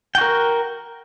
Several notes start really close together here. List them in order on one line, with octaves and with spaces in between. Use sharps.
G5 F#4 A#4